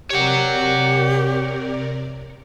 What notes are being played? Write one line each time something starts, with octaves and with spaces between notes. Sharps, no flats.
C3 G4 A#4 C#5 D5 F#5